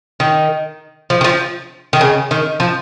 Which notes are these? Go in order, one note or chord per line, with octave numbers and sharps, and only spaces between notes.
D#3
F3
D#3
F3
D#3
C#3
D#3
F3